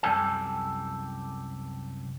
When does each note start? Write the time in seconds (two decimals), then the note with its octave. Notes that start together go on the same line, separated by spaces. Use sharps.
0.03 C2 F#2 G4 A4 G#5